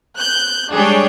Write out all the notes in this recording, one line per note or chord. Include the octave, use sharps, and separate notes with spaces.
F#6 G6
G3 G#3 D4 G#4 C#5 G5